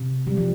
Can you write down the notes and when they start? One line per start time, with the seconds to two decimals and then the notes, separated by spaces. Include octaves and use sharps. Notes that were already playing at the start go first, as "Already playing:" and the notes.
Already playing: C3
0.27 G3
0.37 F3